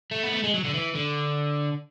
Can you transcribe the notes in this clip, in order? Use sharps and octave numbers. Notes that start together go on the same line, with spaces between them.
A3
B3
A3
G#3
F#3
D3
E3
D3